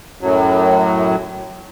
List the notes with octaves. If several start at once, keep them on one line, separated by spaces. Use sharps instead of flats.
F#2 A2 F#3